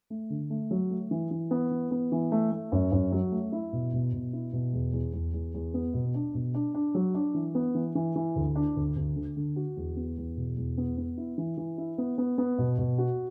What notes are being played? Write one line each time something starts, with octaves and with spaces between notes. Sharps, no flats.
A3
D3
A3
F#3
A3
E3
E3
B3
E3
B3
E3
A3
A3
F#2
F#2
F#3
A3
E4
B2
B2
B2
E4
B2
E2
E2
E2
E2
E2
B3
B2
D4
B2
D4
D4
F#3
D4
E3
B3
E3
E3
E3
D2
D4
D2
D2
D3
D3
F#4
E2
B3
E2
B2
E2
B3
B3
E4
E3
E3
E4
B3
B3
B3
B2
B2
F#4